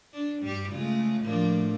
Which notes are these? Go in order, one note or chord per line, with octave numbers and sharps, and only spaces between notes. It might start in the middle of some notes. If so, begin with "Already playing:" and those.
D4
G2 G3 G4
C#3 G#3 A3 F4
A2 F3 A3 A#3 D4